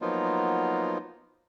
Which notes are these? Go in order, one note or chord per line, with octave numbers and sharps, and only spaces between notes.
F3 F#3 A#3 B3 D#4 F4